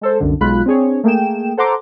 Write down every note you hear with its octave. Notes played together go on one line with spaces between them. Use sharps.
G#3 A4 C5
C2 F#2 D3
B1 G#3 F4 B5 F#6
C4 D4 G#4 C#5
A3 A#3 G#4 G5 E7
A4 C5 F#5 A#5 C6 D6